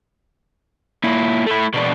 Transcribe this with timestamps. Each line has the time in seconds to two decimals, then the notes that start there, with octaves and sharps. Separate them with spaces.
1.04 A#2 E4
1.46 A3 E4
1.74 B2 D4